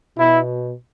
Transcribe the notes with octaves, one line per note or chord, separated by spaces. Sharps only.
B2 E4